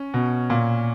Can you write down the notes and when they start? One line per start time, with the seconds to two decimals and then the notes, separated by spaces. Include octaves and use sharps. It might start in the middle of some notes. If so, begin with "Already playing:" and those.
Already playing: C#4
0.14 B2
0.50 A#2